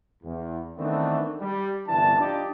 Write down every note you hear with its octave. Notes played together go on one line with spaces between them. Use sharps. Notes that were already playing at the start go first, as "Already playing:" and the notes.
E2
D#3 E3 A3 B3 C4 D4
G3
G1 C2 E3 D4 A5
D4 D#4 F4 G4 D5